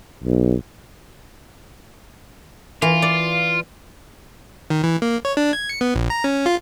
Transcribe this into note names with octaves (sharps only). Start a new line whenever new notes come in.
B1
E3 F4
D5
D#3
E3
A#3
C#5
D4
G#6
C#7
B3
A#1
A#5
C#4
F4